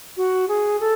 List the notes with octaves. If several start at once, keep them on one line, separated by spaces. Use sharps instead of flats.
F#4
G#4
A4